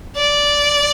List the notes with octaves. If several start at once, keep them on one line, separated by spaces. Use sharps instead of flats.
D5